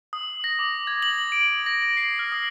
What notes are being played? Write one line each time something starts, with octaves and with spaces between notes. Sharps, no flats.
D#6
A#6
D6
G#6
F#7
D7
A#6
A#6
C7
F6
D#6